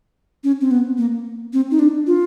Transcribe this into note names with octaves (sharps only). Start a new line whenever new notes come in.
C#4
C4
B3
A#3
C4
D#4
D4
F4